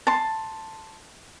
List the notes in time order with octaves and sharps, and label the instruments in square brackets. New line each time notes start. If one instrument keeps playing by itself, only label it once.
[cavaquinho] A5 C6